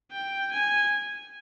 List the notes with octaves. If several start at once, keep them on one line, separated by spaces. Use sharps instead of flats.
G5
G#5